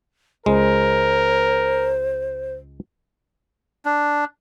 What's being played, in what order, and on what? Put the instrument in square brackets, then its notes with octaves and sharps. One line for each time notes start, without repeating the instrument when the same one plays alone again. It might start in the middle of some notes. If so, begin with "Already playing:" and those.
[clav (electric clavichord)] C#2 G#3 [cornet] A#4 [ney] C5
[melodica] D4